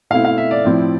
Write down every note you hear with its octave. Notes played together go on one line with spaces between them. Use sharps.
B2 A3 C4 E4 F5
F5
E5
D5
A2 F3 C4 E4